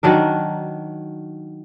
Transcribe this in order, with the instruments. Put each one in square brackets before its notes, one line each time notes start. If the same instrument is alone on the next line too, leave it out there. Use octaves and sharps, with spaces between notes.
[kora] D#3 F#3 D4 A#4